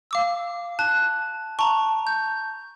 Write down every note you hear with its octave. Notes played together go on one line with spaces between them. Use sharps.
F5 D6 E6
A5 F#6
A5 A#5 C#6
G6